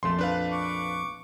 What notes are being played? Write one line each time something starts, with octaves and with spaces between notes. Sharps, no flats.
A#1 F2 A3 C6
D4 B4 F5
C#6 D6